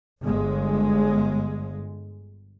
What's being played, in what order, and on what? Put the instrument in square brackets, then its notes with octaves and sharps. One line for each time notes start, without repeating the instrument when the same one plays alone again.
[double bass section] G1 G#3